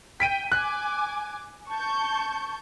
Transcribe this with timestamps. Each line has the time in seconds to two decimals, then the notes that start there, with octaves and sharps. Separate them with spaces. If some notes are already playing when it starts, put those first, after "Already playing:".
0.20 G5 B6 D7 D#7
0.52 G#5 D6 F#6
1.70 A5 C#6 G6